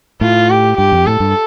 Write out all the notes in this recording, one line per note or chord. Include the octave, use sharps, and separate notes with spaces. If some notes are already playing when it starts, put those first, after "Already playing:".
A2 F4
G4
G2 G4
F2
A2 A4
G2